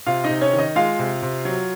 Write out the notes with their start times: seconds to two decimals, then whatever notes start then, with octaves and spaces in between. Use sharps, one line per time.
0.07 C3 F4 F5
0.24 D#4 D#5
0.30 C3
0.41 C#4 C#5
0.53 D#3
0.58 D#4 D#5
0.76 G#3 F4 F5
0.99 C3
1.22 C3
1.45 F#3